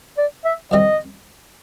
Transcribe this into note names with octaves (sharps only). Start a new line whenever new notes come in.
D5
E5
F2 C3 D#3 G3 C4 D#5